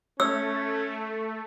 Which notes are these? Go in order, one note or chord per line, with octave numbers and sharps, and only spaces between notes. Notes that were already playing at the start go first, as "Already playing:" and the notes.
A3 C#4 C#5 E6